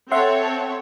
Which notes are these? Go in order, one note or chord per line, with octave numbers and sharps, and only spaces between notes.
C4 A4 C#5 E5 F#5 C6